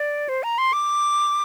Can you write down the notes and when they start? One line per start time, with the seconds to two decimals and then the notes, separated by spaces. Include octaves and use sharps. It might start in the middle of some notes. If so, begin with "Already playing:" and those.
Already playing: D5
0.29 C5
0.43 A#5
0.58 C6
0.73 D6